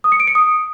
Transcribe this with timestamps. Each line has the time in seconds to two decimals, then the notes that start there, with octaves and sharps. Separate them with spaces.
0.04 D#6
0.12 C#7
0.20 D7
0.27 C#7
0.35 D#6